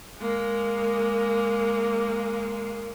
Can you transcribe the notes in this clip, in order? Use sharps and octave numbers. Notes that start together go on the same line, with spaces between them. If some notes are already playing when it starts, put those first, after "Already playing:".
G#3 A#3